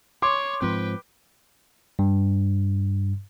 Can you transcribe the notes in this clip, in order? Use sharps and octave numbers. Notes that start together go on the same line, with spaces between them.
C#5 C6 D6
G#2 F3 C4 B4 G5
G2